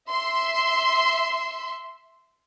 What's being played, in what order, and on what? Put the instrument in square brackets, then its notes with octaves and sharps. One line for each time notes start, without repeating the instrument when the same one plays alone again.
[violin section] E5 C6